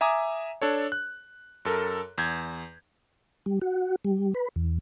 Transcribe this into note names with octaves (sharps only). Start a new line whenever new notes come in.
E5 G#5 A#5 D6 D#6
D4 A4 C#5
F#6
F#2 A4 A#4
E2 G6 G#6
G3
F#4
G3
B4
E2